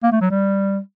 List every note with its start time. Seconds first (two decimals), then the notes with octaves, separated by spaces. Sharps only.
0.03 A#3
0.12 A3
0.21 F#3
0.30 G3